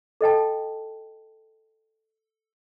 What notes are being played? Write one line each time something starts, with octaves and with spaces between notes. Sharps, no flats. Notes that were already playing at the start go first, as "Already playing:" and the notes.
A4 D#5 G5 A5